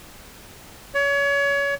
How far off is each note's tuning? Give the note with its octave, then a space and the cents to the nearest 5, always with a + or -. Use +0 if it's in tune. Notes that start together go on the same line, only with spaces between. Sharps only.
C#5 +30